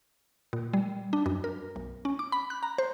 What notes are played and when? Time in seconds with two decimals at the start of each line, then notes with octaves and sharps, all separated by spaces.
0.53 A#2
0.74 G3
1.13 D4
1.26 F#2
1.44 A#4
1.76 B1
2.05 C#4
2.19 D6
2.32 B5
2.50 F#6
2.63 A#5
2.78 C5